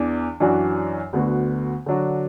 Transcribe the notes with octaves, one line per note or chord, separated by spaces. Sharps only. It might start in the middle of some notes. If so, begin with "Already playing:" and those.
Already playing: E2 E3 D4
F#2 E3 D4 F#4 D5
D2 D3 B3 F#4
D3 F#3 D4 F#4